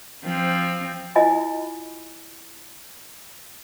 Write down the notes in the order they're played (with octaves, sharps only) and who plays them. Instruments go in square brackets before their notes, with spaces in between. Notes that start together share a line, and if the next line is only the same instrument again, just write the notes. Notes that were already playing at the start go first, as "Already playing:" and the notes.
[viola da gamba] F3 C4
[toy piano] E4 F4 D#5 G#5 B5